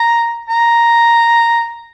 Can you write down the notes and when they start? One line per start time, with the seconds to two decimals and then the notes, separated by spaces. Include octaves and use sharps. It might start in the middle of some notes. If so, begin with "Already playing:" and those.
Already playing: A#5
0.49 A#5